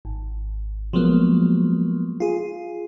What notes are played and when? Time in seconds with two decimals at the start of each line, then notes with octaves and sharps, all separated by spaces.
0.05 G#1
0.93 F3 F#3 G#3 A#3 B3
2.20 F4 G#4